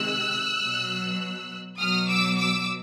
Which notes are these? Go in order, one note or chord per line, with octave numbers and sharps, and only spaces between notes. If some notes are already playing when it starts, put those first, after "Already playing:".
Already playing: C3 D#3 G#3 E6 F#6
B2 F#3
B2 F#3 D#6 F6
D6 E6
D6 E6